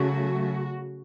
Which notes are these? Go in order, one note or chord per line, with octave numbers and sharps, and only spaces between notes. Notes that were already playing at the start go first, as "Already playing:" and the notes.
Already playing: C#3 F#3 A3 F#4